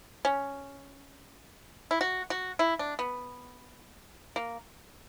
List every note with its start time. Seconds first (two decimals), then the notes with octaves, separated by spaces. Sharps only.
0.25 C#4
1.91 E4
2.01 F#4
2.30 F#4
2.59 E4
2.79 D4
2.99 B3
4.36 A#3